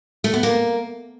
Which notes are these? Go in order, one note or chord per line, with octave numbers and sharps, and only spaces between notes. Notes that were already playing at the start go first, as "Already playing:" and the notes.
A3
B3
A#3